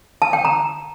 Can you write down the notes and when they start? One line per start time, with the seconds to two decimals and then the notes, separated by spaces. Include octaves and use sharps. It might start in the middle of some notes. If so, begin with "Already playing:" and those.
0.22 A5
0.33 G5
0.45 A#5